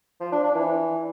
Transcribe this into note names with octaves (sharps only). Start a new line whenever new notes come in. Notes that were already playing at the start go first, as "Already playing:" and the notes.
F3
D4
D4
E3